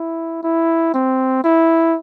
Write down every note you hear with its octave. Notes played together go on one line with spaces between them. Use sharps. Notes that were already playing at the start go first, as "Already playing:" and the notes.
Already playing: E4
E4
C4
E4